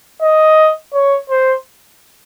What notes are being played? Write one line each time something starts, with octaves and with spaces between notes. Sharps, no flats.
D#5
C#5
C5